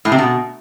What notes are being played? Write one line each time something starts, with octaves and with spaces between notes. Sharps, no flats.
A2
C3
B2